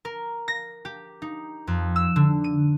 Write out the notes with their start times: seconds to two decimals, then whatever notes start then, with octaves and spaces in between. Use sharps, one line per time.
0.05 A#4
0.48 A#6
0.85 G4
1.22 D#4
1.67 F2
1.96 E6
2.16 D3
2.44 D#7